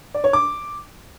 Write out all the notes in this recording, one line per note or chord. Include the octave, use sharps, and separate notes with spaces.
D5
C#5
D6